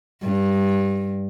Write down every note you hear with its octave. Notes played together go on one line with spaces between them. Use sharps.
G2